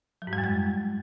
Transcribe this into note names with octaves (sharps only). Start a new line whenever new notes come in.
F#3
G#2
G3
F#2
G#3